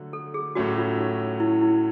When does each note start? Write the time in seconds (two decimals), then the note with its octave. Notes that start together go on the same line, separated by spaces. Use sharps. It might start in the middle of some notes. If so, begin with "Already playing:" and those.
Already playing: D3 F#3 A3
0.13 A4
0.34 G#4
0.55 A2 F#3 A3 C#4 F#4
0.77 F4
0.98 D#4
1.40 E4
1.62 E4